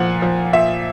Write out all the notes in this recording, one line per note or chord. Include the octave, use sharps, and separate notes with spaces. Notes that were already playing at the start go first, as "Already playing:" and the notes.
Already playing: A#2 F3 F#5
F3
A#2 E5